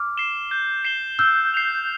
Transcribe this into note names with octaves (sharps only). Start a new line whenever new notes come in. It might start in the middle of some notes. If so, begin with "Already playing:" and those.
Already playing: D6 F6
C7 E7 G7
G6
C7 E7 G7
E6 F6 G6
C7 F7